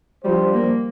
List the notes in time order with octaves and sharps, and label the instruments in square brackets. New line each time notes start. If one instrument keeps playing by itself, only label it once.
[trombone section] F3 D4 G4 C5 [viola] G3
[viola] A#3